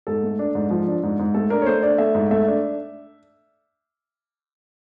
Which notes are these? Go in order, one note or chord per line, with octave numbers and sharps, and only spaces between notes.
G#2 A4
A3
D4
G#2
F3
D4
G#2
G#2
A3 A4
D4 A#4
C#5
A3 C5
D4 D5
A3 E5
G#2
A3 E5
D4